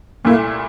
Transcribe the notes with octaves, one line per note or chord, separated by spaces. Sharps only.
C2 A#2 A3 A#3 E4